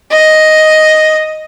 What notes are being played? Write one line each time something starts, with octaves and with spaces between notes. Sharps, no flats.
D#5